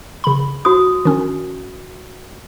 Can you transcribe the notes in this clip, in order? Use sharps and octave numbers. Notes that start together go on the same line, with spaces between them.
C#3 B5
F#4 D#6
D#3 C#4